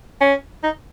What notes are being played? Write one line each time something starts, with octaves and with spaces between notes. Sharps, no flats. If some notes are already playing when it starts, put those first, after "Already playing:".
C#4
D#4